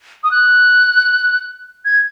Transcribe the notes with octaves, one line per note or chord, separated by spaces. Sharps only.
D#6
F#6
G#6